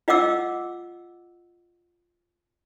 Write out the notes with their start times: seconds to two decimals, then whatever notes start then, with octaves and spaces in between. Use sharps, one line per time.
0.08 F4 D#5 F#5 D6 E6